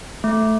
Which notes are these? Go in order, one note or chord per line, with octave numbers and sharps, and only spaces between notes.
A3